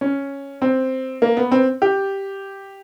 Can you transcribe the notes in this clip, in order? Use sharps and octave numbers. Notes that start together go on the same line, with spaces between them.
C#4
C4
A#3
B3
C4
G4